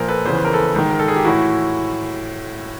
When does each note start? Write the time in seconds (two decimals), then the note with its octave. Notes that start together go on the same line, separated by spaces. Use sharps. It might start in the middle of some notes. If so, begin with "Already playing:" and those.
Already playing: A#2 F3 A#4 C5
0.08 A4 B4
0.25 E2 C#3 E3 C5
0.35 B4
0.45 A#4
0.53 A4 B4
0.75 G#2 D#3
0.91 A#4
0.99 A4
1.08 G#4
1.16 G4
1.24 A2 E3 E4 F#4